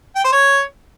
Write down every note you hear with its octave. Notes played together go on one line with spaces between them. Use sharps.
G5
C5
C#5